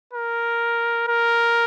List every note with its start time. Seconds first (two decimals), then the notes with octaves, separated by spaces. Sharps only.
0.13 A#4
1.08 A#4